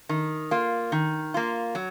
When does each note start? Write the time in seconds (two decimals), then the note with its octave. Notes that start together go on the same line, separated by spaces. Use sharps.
0.09 D#3
0.51 A#3 F4
0.92 D#3
1.34 A#3 F4
1.75 F#3